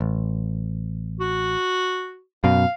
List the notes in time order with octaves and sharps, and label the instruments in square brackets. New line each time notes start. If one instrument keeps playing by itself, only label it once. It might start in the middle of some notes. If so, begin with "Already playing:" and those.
[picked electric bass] A1
[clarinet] F#4
[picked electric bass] F#2 B2 [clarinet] F5